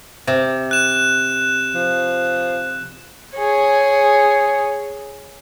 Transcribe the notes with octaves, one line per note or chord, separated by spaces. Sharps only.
C3
F#6 E7
F3
G#4 C#5